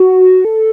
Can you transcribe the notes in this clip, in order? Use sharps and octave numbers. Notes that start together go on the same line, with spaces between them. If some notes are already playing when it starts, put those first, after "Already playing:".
Already playing: F#4
A4